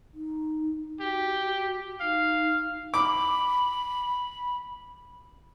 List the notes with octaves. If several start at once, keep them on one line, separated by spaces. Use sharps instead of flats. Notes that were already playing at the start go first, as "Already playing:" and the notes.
D#4
F#4 G4
D#4 F5
B5 D6